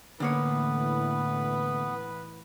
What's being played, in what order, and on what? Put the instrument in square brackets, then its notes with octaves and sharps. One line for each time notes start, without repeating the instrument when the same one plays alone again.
[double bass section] A2 E3 [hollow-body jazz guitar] D3 A#3 C#5 [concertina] B3 [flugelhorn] B4